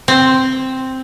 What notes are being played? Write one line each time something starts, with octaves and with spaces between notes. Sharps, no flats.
C4